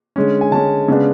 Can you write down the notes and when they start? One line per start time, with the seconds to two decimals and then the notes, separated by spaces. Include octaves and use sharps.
0.16 D3 G#3 C#4
0.41 G#5
0.52 D3 G#3 C#4 A5
0.88 C#3 G#3 B3 D4